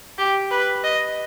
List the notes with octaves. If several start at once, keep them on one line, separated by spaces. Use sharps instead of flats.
G4
B4
D#5